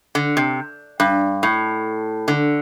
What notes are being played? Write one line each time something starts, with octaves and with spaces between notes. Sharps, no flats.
D3
C3
G2
A2
D3